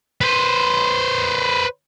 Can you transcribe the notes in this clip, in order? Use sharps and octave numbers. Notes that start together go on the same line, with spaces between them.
B4 C5